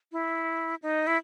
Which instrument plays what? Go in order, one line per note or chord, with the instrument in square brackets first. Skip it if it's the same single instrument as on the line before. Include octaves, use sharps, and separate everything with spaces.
[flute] E4
D#4
E4